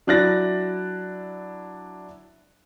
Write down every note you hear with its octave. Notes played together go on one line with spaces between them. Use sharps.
F#3 D4 E4 F#6 A6 A#6